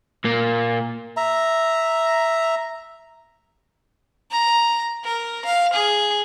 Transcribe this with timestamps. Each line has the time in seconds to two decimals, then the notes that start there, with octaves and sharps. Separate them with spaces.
0.24 A#2 A#3
1.17 E5 A#5
4.31 A#5
5.04 A#4
5.45 F5
5.74 G#4